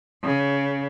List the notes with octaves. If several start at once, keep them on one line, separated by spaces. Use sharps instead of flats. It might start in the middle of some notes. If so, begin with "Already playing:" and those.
C#3